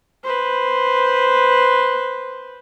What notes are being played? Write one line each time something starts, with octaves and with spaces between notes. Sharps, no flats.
B4 C5